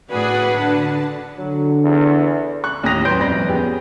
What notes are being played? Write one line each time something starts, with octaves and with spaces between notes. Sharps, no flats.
A2 F#4 G#4 B4 D5 F#5
D3 A5
D3 F#3
E2
C#6 F#6
D#2 A2 D#6 A#6 F7
F#2 C#4 B4 C6 G6 D7
G1 F2 C#4 D5 B5 A#6
B3 C#4 G4 G#4